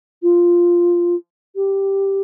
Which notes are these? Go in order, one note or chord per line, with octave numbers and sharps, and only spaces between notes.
F4
G4